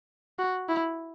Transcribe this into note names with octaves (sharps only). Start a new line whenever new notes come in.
F#4
E4